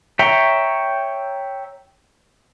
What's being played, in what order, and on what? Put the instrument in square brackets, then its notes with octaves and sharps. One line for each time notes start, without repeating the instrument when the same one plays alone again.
[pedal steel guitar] C#5 E5 G5 A#5